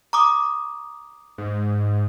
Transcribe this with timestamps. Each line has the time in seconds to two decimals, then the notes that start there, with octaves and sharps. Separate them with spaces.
0.13 A#5 D6 D#6
1.38 G#2